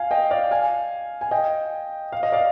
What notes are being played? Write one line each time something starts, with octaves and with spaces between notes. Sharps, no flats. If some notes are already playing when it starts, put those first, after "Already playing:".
Already playing: F5 G#5
D#5 G5
D5 F5
F5 G#5
G#5
D#5 G5
F5
D#5
D5 F5